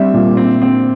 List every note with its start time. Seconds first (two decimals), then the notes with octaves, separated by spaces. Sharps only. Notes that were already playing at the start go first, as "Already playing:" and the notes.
Already playing: G3 C4 E5
0.14 A#2
0.37 C4
0.62 C4